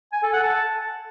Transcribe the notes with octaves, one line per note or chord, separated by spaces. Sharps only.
G#5
A4
F#5
A5